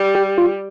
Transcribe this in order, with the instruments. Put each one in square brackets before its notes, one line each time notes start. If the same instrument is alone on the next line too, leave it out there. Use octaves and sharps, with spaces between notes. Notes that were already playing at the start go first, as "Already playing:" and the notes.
Already playing: [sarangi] G3
[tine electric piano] G4
F4